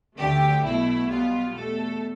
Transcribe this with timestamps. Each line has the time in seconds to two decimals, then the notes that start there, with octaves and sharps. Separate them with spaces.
0.17 D2 D3 A3 G4
0.63 B1 B2 A3 E4
1.09 B1 B2 G3 B3 F4
1.55 E2 B2 A3 A4